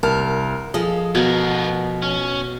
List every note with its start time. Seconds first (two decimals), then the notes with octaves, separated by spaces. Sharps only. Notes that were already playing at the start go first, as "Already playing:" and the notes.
0.03 C2 A#4 A5 F6
0.74 F3 G#4 A4 D#5 F5
1.15 B2 B3 A#4 B5 G#6
2.02 C#4